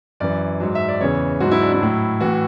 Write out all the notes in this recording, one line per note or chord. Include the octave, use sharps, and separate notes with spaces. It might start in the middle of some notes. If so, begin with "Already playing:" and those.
F#2 E3 D5
G#2 F#3
E5
D5
E2 C#3 E3 C#5
G#2 F#3 F#4
E4
D4
E4
A2 F#3
A2 E3 F#4